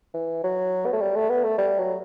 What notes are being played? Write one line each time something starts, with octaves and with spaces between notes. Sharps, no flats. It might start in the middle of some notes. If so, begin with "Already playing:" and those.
E3
F#3
B3
A3
G3
A3
B3
A3
G3
F#3